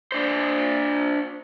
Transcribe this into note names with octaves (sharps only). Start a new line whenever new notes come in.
D4 C5